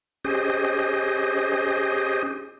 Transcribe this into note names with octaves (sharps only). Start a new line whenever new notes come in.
C#4 G4 G#4 C5 D#5